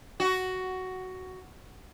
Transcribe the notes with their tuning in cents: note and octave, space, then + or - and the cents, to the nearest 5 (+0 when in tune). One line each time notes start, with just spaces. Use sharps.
F#4 +10